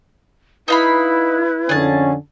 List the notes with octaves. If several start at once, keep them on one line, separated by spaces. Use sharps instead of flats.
D#4 E4 B4 F5 B5
F2 D3 C#4 G#4 A5